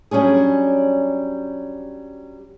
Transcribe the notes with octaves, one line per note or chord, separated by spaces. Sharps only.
F#3 G3 C#4 D4 G#4